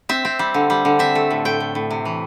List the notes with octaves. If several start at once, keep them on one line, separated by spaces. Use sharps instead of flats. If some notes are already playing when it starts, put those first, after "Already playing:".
C4 E5
C4
G3
D3
G3
D3
C4 E5
A3
A2
A2 G5
A2
A2
C3
E3